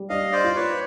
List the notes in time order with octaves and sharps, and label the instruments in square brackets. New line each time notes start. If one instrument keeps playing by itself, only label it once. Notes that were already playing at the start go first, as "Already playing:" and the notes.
Already playing: [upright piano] G3
[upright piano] D4 [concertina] D#5 F5
[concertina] C5 D5
[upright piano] F4
[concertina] B4 C#5